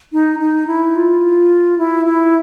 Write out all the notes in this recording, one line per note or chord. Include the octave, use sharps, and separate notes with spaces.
D#4
D#4
E4
F4
E4
E4